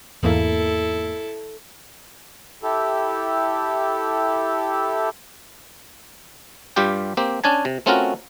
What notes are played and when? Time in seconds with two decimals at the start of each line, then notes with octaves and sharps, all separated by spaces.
0.23 E2 G#2 A#3 E4 A4
2.63 E4 G4 A4
6.76 G2 G3 F4 G4 G5
7.17 A#3 C4 G4
7.44 C#4 D4 G#5 A5
7.65 C3
7.86 A3 C4 C#4 F4 F#4 A#4